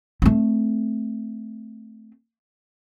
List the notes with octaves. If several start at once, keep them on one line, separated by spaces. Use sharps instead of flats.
A3 C4